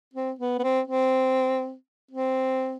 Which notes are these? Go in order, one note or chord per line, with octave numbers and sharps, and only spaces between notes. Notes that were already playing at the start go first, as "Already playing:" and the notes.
C4
B3
B3
C4
C4
C4